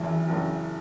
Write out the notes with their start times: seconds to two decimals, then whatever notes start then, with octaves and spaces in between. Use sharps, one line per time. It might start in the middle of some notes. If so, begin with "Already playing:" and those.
Already playing: G#1 F#2 C#3 E3
0.28 G#1 F#2 C#3